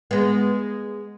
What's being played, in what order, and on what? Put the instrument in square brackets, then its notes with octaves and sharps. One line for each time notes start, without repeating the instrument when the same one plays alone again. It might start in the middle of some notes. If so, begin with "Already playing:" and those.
[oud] G#3 B3